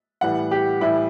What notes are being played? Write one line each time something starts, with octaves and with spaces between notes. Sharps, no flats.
A2 E3 G3 F#5
G4
A2 E3 G3 E4